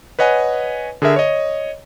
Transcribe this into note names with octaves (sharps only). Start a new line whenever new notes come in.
B4 C#5 D#5 F#5 G#5
D3 G#4 A#4 E5
C#5 D#5